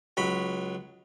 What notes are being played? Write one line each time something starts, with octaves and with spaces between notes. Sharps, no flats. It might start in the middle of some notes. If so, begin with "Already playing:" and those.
C#2 F#3 B5